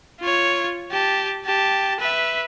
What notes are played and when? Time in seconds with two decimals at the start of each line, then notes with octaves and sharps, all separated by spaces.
0.20 F4 C#5
0.91 G4 A5
1.46 G4 A5
2.00 B4 E5